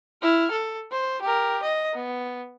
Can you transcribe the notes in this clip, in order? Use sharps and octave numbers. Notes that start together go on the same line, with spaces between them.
E4 F6
A4
C5
G4 A#4
D#5
B3